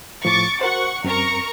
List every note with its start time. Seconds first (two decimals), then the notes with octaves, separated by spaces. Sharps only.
0.25 A2 F3 C#6 D6 A6
0.61 F#4 A#4 C5 F#5 C#6
1.04 F#2 C4 A#4 A#5 C#6